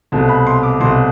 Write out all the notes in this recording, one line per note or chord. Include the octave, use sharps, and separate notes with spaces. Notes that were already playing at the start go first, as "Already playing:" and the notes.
C2 B2 A3 A5
B5
C6
D6
C2 B2 A3 C6